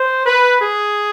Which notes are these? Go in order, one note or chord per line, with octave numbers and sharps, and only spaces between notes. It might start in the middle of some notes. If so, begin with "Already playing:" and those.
Already playing: C5
B4
G#4